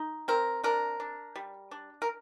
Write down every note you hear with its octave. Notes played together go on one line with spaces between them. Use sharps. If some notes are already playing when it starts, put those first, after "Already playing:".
Already playing: D#4
C4 A#4
D4 A#4
D4
G3
D4
A#4